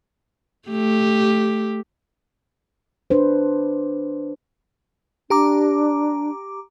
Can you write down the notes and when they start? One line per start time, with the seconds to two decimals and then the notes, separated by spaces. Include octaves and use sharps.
0.69 A3 G4
3.10 D4 B4 C5
5.30 D4 G4 A#5 D6